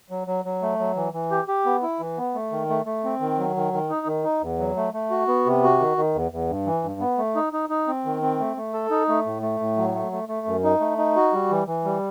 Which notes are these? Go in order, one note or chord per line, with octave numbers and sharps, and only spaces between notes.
F#3
F#3
F#3
A3
F#3
E3
E3
G4
G4
B3
E4
E3
B3
A3
D#3
A3
A3
C4
D#3
F#3
D#3
D#3
D#4
D#3
D#4
E2
F#3
A3
A3
F#4
B3
C3
F#4
D#3
D#3
E2
E2
G2
E3
G2
B3
A3
D#4
D#4
D#4
C4
D#3
C4
A3
A3
A4
D#4
A3
A2
A3
A2
F#3
A3
A3
A3
F#2
D#4
A3
D#4
F#4
G3
E3
E3
G3